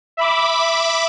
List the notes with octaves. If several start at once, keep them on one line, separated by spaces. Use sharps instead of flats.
E5 B5 D6